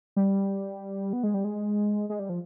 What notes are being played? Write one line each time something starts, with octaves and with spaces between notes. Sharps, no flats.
G3
B3
G#3
G3
G#3
G#3
G3
F3